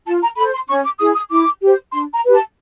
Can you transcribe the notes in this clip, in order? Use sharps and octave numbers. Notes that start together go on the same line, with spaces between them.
F4 A5
A#5
A4 C5 B5
C6
C#4 C#6
D6
E4 G#4 D#6
D#6
E4 D6
G4 C5
D4 C6
A#5
G4 B4
A5